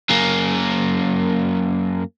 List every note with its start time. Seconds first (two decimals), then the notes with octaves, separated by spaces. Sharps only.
0.10 F#2 A#3